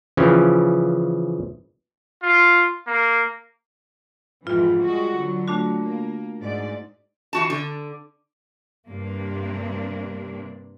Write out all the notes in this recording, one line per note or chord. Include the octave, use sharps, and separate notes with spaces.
C#3 E3 F3 C#4
F4
A#3
F2 G#2 E3 F4
G3 G#3 F#4
D3 F#3
A3 D4 F#4
A#3
G#2 D5
E3 F#4 A5
D3
G2 C3 A#3 D4